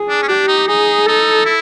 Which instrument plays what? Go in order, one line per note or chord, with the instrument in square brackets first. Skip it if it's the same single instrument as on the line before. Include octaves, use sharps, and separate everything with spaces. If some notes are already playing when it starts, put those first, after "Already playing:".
Already playing: [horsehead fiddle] G#4
[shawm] D4
C#4
[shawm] D4 [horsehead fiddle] G4
[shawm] D#4
[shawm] D#4 [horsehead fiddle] G#4
[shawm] D#4 [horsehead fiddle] A4
[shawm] E4